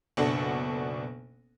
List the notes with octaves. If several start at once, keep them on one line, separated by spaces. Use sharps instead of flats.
F#1 B2 D4 A4 F#5